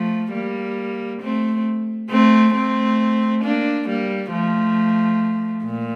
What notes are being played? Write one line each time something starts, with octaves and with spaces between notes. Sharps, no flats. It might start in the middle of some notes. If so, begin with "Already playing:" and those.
Already playing: F3 A3
G3 A#3
A3 C4
A3 C4
A3 C4
A#3 D4
G3 A#3
F3 A3
A#2